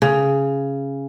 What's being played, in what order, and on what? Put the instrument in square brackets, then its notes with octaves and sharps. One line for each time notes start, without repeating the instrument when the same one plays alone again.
[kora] C#3